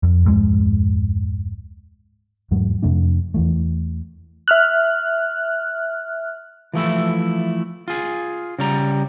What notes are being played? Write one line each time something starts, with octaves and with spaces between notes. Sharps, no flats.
F2
D1 F2 G#2 G#3
E2 G#2 F#3 A3
F2 C3 A3 D4
E2 E3 A3
E5 F6 F#6
E3 F3 A3 E4
F4 G#4
C#3 G3 A#5